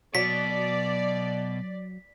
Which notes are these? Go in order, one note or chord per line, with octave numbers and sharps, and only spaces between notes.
B2 F#3 D5 B6